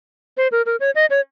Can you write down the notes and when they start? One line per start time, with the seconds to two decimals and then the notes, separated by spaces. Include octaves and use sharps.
0.37 C5
0.52 A#4
0.66 A#4
0.80 C#5
0.95 D#5
1.10 C#5